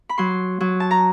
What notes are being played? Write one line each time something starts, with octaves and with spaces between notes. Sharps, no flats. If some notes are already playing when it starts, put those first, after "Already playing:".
B5
F#3 C6
F#3
A5
A#5